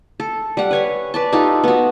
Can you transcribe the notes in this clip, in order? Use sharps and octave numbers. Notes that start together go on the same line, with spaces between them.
A4
G3 F#5
B4 C#5 G#5
B4 D5 A5
D#4 F4 G4 A4
B3 F#4